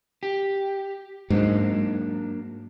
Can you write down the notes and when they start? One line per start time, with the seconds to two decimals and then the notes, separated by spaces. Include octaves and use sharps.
0.23 G4
1.30 G#2 F#3 A#3 D4